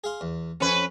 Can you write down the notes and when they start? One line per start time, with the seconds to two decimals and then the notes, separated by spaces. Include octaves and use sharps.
0.04 G#4 F5 C6
0.21 E2
0.60 F2 F3 C#4 B4